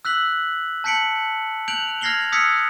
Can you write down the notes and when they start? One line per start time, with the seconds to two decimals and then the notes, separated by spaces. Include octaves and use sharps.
0.05 E6 F#6 B6 F#7
0.84 A5 G6 B6 C#7 D7 F#7
1.68 F#6 G6 D7 F7 F#7
2.01 F6 G#6 A#6 C7 F7 G7
2.32 D#6 E6 F#6 G#6 B6 C#7